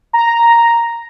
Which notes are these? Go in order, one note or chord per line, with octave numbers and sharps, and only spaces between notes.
A#5